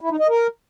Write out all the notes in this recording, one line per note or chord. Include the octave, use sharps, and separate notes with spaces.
E4
D#4
D#5
A#4